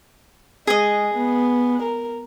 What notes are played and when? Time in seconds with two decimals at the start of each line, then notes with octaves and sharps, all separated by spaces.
0.67 G#3 G#4 D#5
1.14 B3
1.82 A#4